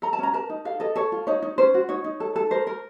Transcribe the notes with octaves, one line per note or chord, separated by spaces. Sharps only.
A4 A#5
A5
C#4 A#5
A#4 A5
D#4
A4 F5
A4 D#5
A4 C#5
F4
D#4 C#5
D#4
C#4 C5
F#4
D#4 C#5
D#4
A4
A4
A#4 C5
A#4